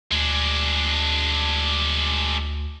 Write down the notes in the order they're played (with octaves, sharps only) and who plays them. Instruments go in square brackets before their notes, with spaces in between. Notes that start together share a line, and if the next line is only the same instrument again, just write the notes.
[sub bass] D2 [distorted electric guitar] G#3 D4